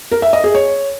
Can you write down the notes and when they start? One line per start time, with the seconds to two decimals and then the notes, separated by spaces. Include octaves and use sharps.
0.12 A#4
0.22 E5
0.33 D#5
0.44 G#4
0.55 C#5